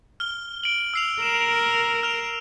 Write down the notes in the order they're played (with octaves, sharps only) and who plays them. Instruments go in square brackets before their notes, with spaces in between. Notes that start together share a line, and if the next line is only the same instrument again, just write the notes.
[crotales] F6 G7
D7 F#7
E6 C7 F7
[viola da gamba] A#4 [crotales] E7
[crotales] F6 F7